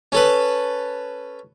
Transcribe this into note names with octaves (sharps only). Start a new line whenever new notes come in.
C#4 A4 B4